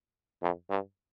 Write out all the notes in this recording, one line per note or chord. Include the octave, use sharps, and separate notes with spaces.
F2
G2